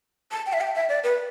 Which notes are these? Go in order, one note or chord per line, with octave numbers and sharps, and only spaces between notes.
A5
G5
E5
G5
E5
D5
B4